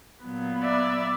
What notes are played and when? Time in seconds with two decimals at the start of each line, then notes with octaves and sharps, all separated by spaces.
0.22 A#2 F#3 B3
0.62 D5 E5